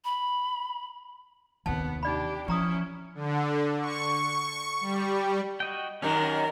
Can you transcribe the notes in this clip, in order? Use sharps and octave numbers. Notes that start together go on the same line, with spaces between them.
B5
D#2 C3 B3 A5
D4 D#4 G4 D5 B5
F3 C#4 E4 G4 A#5 D#6
D3
C#6
G3
F#4 D#5 G5
F#2 D#3 C#4 G4 A#4 F#5